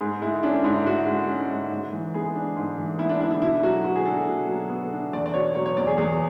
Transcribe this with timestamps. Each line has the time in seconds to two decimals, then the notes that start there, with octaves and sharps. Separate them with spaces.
0.01 G#2 G#4
0.21 G#3 E4
0.43 C#4 D4
0.64 G#2 E4
0.86 G#2 F#4
1.06 G#3
1.28 C#4
1.50 G#2
1.71 G#2
1.93 E3
2.14 B3 G#4
2.35 D4
2.56 G#2
2.78 E3
2.99 B3 E4
3.09 D4
3.21 D4 E4
3.31 E4
3.42 B2 E4
3.63 F#3 F#4
3.85 B3 F#4
3.96 G#4
4.06 D4 A4
4.27 B2
4.48 F#3
4.70 B3
4.92 D4
5.13 E2 D5
5.26 D5
5.34 B2 C#5
5.55 F#3 C#5
5.66 C#5
5.77 E2 D5
5.87 G#4
5.98 E2 G#4